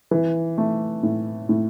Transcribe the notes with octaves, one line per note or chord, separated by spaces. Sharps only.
E3
A3
A2
A2